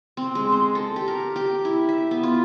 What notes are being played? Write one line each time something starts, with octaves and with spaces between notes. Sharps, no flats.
C4
G#3
C5
A4
G4
A#4
G4
E4
E5
B3
F4